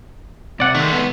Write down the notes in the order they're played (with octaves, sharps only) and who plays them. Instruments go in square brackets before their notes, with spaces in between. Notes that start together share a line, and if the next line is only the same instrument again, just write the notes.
[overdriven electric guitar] C3 [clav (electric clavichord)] D5 F#5
[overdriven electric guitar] D#3 [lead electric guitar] G#3 A3
[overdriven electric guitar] B3